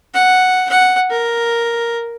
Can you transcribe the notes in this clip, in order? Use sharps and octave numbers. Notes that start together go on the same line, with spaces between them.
F#5
F#5
A#4